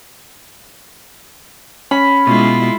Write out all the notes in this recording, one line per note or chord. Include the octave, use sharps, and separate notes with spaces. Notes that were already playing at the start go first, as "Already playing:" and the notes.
C#4 B5
B2 G#3 E4 F4